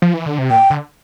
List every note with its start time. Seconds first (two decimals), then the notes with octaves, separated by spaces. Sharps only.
0.02 F3
0.14 E3
0.26 D3
0.39 C3
0.50 A#2 G5
0.70 D3